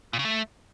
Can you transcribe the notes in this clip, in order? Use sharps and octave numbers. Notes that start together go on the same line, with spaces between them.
A#2
C#3
A3